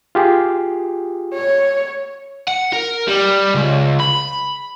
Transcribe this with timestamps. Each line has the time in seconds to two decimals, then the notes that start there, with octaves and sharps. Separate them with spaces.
0.15 F4 G4 G#4
1.34 C#5
2.48 F#5
2.73 A#4
3.07 G3
3.54 C#2
4.00 B5